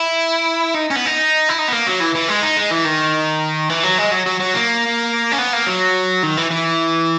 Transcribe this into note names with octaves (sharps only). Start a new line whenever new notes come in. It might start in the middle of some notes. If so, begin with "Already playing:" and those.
Already playing: E4
D#4
C#4
B3
D#4
E4
D#4
B3
A#3
F#3
E3
E3
G#3
D#4
G#3
E3
D#3
E3
F#3
G#3
F#3
F#3
F#3
A#3
C#4
B3
A#3
F#3
D#3
E3
E3